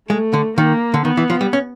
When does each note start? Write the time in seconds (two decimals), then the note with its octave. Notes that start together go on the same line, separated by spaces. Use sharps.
0.09 G#3 A3
0.33 D3
0.57 D#3 A#3
0.94 D3
1.05 D#3 B3
1.17 E3
1.30 F3
1.41 G3
1.53 C#4